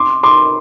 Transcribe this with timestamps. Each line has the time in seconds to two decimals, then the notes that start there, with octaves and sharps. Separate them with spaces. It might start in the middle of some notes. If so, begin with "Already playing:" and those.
Already playing: C6 D6
0.23 C6 D6